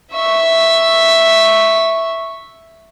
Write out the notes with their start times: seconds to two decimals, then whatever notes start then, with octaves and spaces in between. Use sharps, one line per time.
0.12 E5 C#6